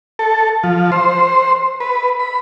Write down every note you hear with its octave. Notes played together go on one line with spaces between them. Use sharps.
A4
F3
C5
B4
B5